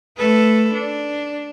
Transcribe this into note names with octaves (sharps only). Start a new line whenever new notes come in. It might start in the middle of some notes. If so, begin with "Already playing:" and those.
A3 A4 B4
D4